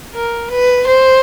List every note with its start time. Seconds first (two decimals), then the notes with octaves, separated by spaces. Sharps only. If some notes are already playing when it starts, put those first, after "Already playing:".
0.14 A#4
0.50 B4
0.87 C5